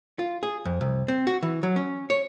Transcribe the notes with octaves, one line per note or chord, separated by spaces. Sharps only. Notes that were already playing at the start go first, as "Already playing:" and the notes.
F4
G#4
F2
C2
C4
F#4
E3
F#3
C#4
C#5